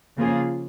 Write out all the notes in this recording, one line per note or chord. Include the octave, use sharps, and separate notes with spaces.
C#3 F3 A#3 F4 G#4